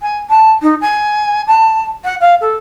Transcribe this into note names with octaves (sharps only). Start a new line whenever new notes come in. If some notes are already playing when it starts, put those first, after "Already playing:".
G#5
A5
D#4
G#5
A5
F#5
F5
A4